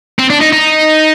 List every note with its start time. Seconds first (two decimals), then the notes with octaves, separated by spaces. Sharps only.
0.19 C4
0.30 D4
0.41 D#4
0.52 D#4